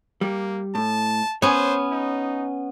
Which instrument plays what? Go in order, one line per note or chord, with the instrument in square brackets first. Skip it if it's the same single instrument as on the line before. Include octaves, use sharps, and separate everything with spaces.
[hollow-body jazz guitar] G3 [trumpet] A#3
[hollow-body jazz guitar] A2 [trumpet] A5
[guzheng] B3 C#4 [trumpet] C5 [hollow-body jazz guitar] C#5 G#5
[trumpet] D#4